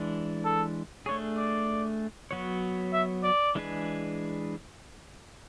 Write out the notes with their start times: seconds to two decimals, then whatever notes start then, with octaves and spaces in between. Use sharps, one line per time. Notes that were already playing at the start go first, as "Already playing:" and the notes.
Already playing: E3 G#3 D4
0.45 A4
1.06 A3 D4 G#4 C#5
1.37 D5
2.31 F#3 B3 F#4 C#5
2.93 E5
3.23 D5
3.55 E3 G#3 D4 G#4 B4